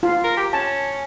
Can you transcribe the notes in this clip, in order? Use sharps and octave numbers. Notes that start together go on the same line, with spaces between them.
F4
A#4
G4
C#4 A5